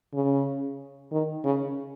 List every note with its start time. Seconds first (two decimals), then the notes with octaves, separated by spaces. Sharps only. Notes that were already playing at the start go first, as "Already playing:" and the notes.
0.14 C#3
1.11 D#3
1.44 C#3